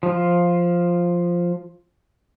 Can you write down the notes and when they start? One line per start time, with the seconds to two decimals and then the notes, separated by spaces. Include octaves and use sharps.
0.03 F3 F4